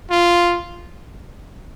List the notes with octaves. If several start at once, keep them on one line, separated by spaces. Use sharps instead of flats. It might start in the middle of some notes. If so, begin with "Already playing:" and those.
F4